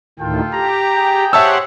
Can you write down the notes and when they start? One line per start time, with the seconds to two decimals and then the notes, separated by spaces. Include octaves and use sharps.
0.19 D2 A2 D#3 F4 A4 G5
0.53 G4 A#5
0.95 G#4 G5
1.33 G4 C5 C#5 E5 F#5 A5 E6